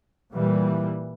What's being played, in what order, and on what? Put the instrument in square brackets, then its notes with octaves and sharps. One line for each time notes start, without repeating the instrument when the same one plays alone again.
[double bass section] A#2 E3 G3